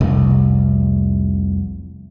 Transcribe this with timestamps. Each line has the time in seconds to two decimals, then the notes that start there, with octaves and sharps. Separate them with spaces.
0.01 F1 C2